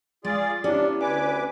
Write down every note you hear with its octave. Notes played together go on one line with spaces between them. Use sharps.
G#3 F4 G#4 D5 A6
B3 C#4 D4 E4 G4 D5
D2 B4 D5 G#5 D6